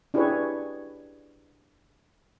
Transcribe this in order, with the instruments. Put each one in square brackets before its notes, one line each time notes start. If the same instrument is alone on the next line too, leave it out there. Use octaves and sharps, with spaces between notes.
[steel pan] D4 E4 G4 G#4 B4 C#5